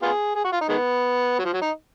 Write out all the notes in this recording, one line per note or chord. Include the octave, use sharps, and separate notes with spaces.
B3 F4 G#4
G#4
F#4
F4
D#4
D#3 G#3 B3
F#3
F3
F#3
D#4